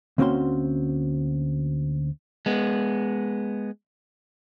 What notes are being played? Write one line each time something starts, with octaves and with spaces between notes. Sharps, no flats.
D2 A#3 C4 C#4 F#4 C6
G#3 B3